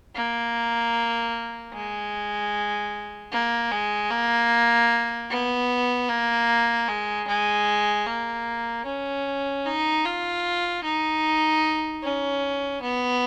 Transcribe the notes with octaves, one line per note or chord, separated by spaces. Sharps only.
A#3
G#3
A#3
G#3
A#3
B3
A#3
G#3
G#3
A#3
C#4
D#4
F4
D#4
C#4
B3